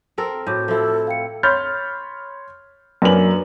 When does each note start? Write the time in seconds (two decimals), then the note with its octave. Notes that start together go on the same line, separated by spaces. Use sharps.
0.18 C4 A4 A#4
0.47 A2 F#4 C#5 D6 G6
0.68 F3 E4 A4
1.07 F5 G5 C#7
1.43 C#5 B5 C6 F6 G6 A6
3.02 F#2 A#3 D4 B4 F#7